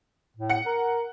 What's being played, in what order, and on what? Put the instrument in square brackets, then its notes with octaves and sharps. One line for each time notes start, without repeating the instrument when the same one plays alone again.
[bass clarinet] A2
[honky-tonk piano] F#5 C#7
[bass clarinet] A#4